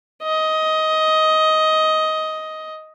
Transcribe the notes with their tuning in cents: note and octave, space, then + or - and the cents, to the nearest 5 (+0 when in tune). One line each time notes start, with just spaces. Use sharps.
D#5 +15